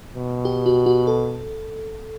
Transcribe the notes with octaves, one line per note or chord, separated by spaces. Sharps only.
B2
G4
F#4
F#4
A4